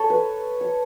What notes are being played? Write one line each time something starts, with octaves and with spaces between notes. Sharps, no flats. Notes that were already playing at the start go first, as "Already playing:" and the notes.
Already playing: A4 C#5
B4
C#5